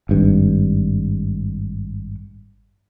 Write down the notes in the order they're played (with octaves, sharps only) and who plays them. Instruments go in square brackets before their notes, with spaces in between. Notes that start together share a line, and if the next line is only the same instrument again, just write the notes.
[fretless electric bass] G#1 G2